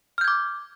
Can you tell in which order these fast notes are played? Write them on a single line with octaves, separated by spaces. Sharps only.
F6 G6 G#6 D6